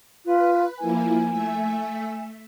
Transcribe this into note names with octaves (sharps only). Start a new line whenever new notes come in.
F4 B4
F3 A#3 E4 G#5
A3 E5